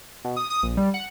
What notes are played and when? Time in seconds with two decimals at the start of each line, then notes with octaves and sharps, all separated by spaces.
0.25 B2
0.37 D#6
0.50 D#6
0.63 A#1
0.77 G3
0.94 F#5